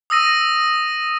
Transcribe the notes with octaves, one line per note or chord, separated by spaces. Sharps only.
D#6 E6 A#6 D#7